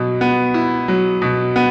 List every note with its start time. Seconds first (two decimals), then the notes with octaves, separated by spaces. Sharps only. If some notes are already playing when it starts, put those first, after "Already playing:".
Already playing: B2 F#3
0.21 B3
0.54 E4
0.88 F#3
1.22 B2
1.56 B3